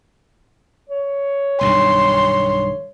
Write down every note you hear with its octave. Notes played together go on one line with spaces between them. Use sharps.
C#5
B1 G2 D#3 C6